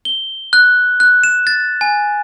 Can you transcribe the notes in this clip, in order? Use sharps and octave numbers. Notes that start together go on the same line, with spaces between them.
G7
F#6
F#6
E7
A6
G#5